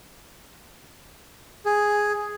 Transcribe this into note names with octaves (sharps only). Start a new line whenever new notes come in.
G#4